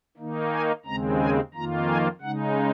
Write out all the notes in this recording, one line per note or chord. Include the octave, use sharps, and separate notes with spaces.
D#3 A#3 D#4
G#5
D#2 C#3 G#3 C4 A#5
G#5
F2 D#3 A#3 F4 A#5
G#5
C#3 G#3 D#4 F#5